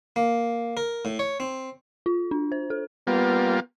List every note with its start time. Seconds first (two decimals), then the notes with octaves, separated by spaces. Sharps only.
0.16 A#3
0.77 A#4
1.05 A2
1.19 C#5
1.40 C4
2.06 F4
2.31 D4
2.52 C5
2.70 A4
3.07 G3 A#3 B3 F4